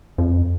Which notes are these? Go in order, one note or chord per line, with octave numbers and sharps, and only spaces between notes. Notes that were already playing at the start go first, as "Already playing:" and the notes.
F2